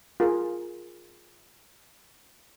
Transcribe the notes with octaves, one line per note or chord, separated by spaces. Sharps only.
F4 G#4 A#4